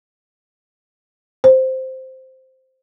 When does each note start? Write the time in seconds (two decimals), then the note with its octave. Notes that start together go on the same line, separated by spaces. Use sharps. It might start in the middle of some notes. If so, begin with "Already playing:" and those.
1.44 C5